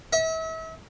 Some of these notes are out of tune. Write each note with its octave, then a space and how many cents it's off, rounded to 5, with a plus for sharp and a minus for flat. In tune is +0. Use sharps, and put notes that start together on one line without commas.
E5 -35